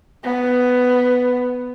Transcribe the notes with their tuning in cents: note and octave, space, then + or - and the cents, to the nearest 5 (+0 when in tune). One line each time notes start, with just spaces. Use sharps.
B3 +10